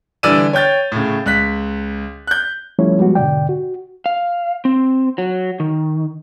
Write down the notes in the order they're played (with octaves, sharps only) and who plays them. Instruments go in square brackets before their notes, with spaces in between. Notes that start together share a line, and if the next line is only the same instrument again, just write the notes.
[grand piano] D3 E3 G3 D5 E6 D#7
C#5 G5 G6 A6
A2 C#3
C#2 F#6 B6
F#6 G6
[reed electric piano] F3 G3 A3 C#4 E4 C#5
F3 G3 G#3 B3 F#4
G#2 B2 D3 D5 G5
F#4
[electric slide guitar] F5
C4
F#3
D#3